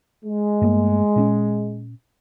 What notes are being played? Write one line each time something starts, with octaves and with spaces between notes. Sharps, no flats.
G#3
G2 A3 A#3
A#2 C4 C#4